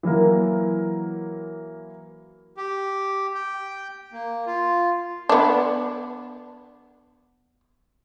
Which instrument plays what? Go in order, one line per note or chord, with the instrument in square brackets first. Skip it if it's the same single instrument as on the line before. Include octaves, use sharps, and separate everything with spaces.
[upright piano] E3 F#3 A#3 A#4
[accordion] G4
G5
A#3
F4
[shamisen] B3 D4